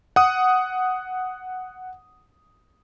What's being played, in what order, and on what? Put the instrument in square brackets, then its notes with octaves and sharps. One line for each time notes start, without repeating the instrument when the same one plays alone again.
[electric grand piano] F#5 D#6